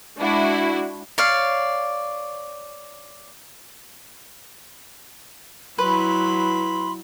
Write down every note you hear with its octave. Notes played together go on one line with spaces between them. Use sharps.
G#3 D4 E4 F#4
C#5 D5 F5
F#3 E4 B4 B5 C6